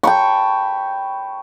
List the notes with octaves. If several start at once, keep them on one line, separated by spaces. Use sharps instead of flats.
G5 A5 B5 C#6